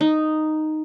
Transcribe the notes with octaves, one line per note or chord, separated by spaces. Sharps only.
D#4